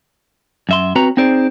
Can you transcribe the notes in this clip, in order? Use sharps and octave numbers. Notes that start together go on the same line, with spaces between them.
F#2 E5 C6
C4 F#4 B4 C#5 A#5
C4 D#4 G#4 C5 D5